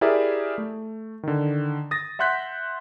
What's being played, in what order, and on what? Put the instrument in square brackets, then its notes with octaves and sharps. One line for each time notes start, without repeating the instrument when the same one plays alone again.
[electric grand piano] E4 G4 G#4 A#4 D5 E5
A3
D3 D#3
D#6 A6 A#6
E5 F#5 C6 F#6 G6 B6